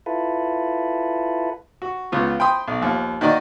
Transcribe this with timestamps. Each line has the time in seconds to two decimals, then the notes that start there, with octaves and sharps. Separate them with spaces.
0.06 E4 F4 A4 B4
1.82 F#4
2.12 C#2 B3 F4
2.40 G5 B5 C6 D#6
2.68 B1
2.81 D#2 F3
3.21 D#3 A#3 F#4 D5 D#5